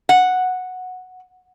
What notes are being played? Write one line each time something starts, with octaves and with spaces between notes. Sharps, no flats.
F#5